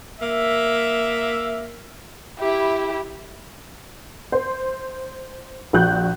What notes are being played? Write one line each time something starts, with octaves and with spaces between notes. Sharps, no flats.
A#3 E5
E4 G4
C5
A#1 F#4 F#6 G6